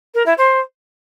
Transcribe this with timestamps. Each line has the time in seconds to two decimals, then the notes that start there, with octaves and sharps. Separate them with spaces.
0.14 A#4
0.26 E4
0.37 C5